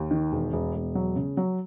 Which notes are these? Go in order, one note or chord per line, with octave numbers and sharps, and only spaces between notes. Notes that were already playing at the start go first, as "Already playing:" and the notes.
Already playing: D#2
D#3
E1
E1
E1
F#3
C#3
F#3